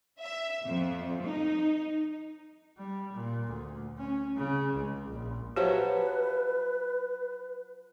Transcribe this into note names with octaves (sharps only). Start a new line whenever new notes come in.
E5
F2
D#4
G3
A#2
D2
C#4
C#3
C#2
A#1
F3 F#3 G4 B4 C5 E5